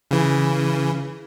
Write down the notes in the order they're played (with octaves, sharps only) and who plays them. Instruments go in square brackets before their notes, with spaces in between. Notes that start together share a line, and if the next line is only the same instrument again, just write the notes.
[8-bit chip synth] C#3 E3